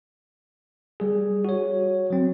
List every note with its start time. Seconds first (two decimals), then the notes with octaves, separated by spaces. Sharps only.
1.00 G3 G#4
1.45 F#4 C#5
2.10 F#3 C4